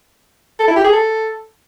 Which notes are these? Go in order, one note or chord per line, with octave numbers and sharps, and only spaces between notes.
A4
E4
G4
G#4
A4